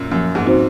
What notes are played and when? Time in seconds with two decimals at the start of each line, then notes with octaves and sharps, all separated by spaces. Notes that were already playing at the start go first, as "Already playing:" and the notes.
Already playing: F#2 A#2
0.11 F#2 F3
0.35 G#2
0.46 C4 D#4 F#4 C5